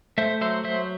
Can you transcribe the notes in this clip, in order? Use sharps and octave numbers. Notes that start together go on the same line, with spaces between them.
A3 C5 E5
F#3 C5 E5
F#3 C5 E5